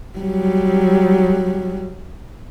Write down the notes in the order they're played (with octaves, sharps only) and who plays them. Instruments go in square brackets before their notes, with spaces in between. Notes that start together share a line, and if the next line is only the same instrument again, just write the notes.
[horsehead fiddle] F#3 G3